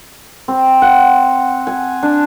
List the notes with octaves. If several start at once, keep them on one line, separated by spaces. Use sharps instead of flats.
C4
F#5
G#5
D4